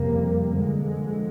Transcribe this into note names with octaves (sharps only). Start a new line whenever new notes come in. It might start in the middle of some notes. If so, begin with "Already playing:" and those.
Already playing: F2 C3 G3 A#3
F2 D3 G#3